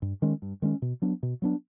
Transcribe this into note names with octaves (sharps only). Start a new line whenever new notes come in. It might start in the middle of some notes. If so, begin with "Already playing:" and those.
G2
D#3 G#3 C#4
G2
D#3 G#3 C#4
B2
F#3 B3 D4
B2
F#3 B3 D4